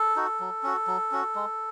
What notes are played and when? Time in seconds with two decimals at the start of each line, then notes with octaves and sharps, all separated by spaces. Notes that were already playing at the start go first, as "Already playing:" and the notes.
Already playing: A4
0.16 D#4 F#4
0.40 F#3
0.63 C#4 F#4
0.87 F#3
1.12 C#4 F#4
1.36 G#3